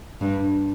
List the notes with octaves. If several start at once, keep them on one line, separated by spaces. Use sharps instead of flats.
G2